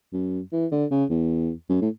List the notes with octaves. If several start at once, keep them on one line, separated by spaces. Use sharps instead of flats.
F#2
E3
D3
C#3
E2
F#2
A2